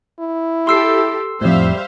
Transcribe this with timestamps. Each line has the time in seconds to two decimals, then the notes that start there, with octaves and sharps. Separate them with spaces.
0.20 E4
0.67 G4 A4 C6 E6 C7
1.41 F2 A2 G3 C5 E5 F5